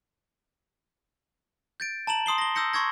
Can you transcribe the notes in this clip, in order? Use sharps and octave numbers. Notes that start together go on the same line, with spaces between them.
G6 A6 D7
A5 A#5 E7 F#7
C6 D#6 C7 G7
A#6 G7
D#6 E6 G6 A#6 C#7
C6 C#6 E6 G#6 A#6